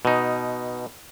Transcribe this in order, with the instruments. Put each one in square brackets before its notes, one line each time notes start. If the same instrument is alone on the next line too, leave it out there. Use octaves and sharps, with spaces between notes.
[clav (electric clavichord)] B2 D#4